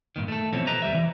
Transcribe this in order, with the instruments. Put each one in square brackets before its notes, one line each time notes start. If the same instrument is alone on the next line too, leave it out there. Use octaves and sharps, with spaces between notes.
[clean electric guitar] G2 A#2 D#3
A3 A4
B2 E3 F3 C4 C#4
G4 B4 D#5 A5 A#5
D#2 G3 E5
E3